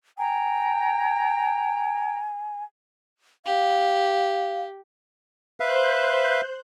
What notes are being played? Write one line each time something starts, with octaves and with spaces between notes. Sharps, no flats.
G5 G#5 A#5
G4 F5
B4 C5 E5 F5 F#6 G6